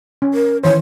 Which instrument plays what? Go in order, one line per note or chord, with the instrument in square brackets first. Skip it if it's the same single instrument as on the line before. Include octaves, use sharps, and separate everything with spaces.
[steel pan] C#4
[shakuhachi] A#4
[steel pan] D#3 E3 C5 [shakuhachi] C#5